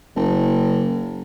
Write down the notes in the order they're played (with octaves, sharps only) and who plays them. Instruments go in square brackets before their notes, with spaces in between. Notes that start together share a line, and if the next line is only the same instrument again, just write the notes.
[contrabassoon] F#1